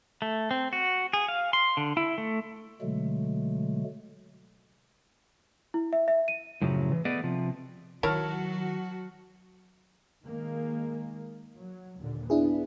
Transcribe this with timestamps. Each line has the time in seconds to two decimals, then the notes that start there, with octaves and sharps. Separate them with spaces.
0.22 A3
0.51 C4
0.73 F#4
1.13 G#4
1.28 F5
1.53 C6
1.77 D3
1.97 E4
2.18 A3
2.81 B2 D3 F#3 G#3 A3
5.74 E4
5.93 E5
6.08 E5
6.28 D#7
6.62 F#2 A2 C#3 F3 F#3
6.92 E3
7.05 A3 B3 G#4 B4 D5 D#5
7.23 C3 F3
8.03 D#3 F#3 E4 F#4 A#4 C#5 A5 F6
10.25 D#3 G#3 A#3
11.57 F#3
11.99 D#2 A#2 D3
12.30 B3 D4 E4 G#4